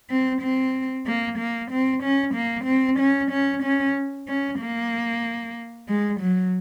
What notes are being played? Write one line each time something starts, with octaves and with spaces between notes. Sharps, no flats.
C4
C4
A#3
A#3
C4
C#4
A#3
C4
C#4
C#4
C#4
C#4
A#3
G#3
F#3